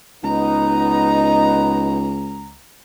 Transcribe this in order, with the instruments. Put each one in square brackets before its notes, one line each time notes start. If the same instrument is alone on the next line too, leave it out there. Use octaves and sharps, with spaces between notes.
[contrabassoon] C#2 [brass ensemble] B3 D#4 [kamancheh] A#5